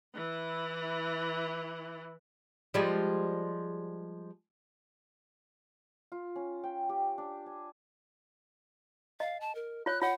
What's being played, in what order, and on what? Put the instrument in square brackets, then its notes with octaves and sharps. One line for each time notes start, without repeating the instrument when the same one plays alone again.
[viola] E3 E4
[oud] F3 G3 G#3
[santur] F4
C#4
G5
G4
D4
G#5
[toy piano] D#5 [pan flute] F5
[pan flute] A5
A#4
[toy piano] F4 C#5 [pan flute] F#6
[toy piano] F4 C#5 [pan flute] F#5